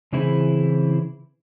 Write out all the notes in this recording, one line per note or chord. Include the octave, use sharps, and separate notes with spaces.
C#3 E3 C4 E4 G#4